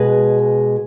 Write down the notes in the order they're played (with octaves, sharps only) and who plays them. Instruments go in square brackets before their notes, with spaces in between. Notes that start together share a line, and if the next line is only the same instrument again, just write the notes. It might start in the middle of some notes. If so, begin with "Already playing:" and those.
Already playing: [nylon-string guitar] B2 G#3 G#4 B4